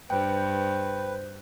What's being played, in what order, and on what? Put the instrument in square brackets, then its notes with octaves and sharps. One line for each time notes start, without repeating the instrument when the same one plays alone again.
[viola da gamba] G2 [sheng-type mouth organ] B4 [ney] C5 [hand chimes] G5